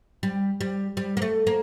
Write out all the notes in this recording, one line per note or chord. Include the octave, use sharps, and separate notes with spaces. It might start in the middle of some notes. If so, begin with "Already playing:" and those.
G3
G3
G3
A#3
A3
A#3